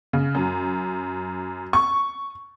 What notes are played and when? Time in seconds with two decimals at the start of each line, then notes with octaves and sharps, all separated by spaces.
0.13 C#3
0.35 F#2
1.73 C#6